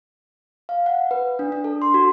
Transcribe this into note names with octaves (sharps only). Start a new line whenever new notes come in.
F5
F#5
B4
D4
D4
A4
C6
F#4